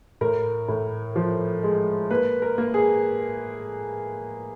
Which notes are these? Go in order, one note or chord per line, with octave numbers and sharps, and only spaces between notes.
A2 A#4
A2
F3
G#3
A#3 B4
A#4
A#3
G#4